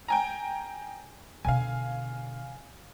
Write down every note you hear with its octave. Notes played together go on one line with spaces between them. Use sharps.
G5 G#5 A#5
B2 D3 F5 G#5